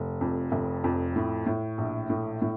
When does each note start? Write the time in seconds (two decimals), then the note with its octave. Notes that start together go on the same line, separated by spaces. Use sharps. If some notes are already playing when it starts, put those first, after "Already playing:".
Already playing: F1
0.21 F2
0.52 F1
0.84 F2
1.16 A2
1.46 A2
1.78 A#1
2.10 A2
2.42 A2